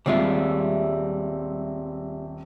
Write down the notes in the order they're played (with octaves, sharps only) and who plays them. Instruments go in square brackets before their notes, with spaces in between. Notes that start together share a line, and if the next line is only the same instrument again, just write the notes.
[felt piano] D#1 C4 E5 [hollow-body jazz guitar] G3 G#3 F4